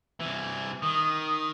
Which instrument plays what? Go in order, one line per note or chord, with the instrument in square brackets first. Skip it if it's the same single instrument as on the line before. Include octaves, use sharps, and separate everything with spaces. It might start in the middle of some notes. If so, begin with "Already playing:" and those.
[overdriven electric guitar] C2 E3
[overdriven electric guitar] D#3 [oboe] D#6